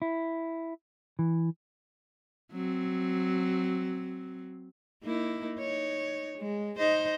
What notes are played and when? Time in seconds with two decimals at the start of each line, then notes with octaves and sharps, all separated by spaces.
0.02 E4
1.19 E3
2.53 F#3 C4
5.03 A#3 D#4 E4
5.58 D#4 C#5
6.38 G#3
6.78 D#4 C5 D#5